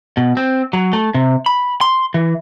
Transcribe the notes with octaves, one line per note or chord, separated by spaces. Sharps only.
B2
C4
F#3
A3
C3
B5
C6
E3